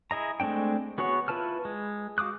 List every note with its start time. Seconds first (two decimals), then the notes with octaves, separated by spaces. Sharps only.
0.11 E4 G#4 D#5 A#5
0.40 G#3 A3 C4 D4 G5
0.98 B3 F#4 G#4 C#5
1.28 E4 F4 B4 A5 F6
1.65 G#3
2.18 F#4 F5 D6 D#6 F#6